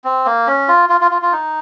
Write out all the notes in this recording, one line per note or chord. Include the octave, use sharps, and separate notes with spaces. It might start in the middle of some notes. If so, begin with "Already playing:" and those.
C4
A#3
C#4
F4
F4
F4
F4
F4
D#4